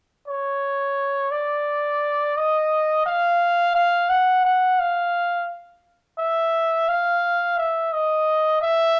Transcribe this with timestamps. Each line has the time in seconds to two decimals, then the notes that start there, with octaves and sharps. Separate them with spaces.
0.28 C#5
1.31 D5
2.37 D#5
3.06 F5
3.75 F5
4.09 F#5
4.45 F#5
4.79 F5
6.18 E5
6.88 F5
7.58 E5
7.93 D#5
8.62 E5